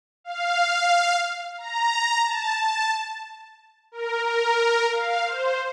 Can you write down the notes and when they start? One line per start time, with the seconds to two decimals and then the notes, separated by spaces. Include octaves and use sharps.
0.24 F5
1.58 A#5
2.24 A5
2.59 A5
3.92 A#4
4.25 A#4
4.92 F5
5.26 C5